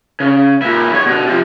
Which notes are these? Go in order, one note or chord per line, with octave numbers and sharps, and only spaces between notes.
C#3
A#2 E4
E2 C#5
B2 D3
C3 F3